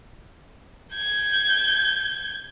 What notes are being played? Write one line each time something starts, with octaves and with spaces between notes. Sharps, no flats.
G6 G#6